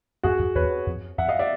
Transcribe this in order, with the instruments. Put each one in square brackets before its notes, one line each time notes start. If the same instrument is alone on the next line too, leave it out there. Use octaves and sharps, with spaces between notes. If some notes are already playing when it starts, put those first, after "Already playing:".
[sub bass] F2 [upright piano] F#4 G#4
[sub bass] F2
[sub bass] E2 [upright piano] B4 C#5
[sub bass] F2
[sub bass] F2 [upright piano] E5 F#5
[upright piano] D#5 F5
D5 E5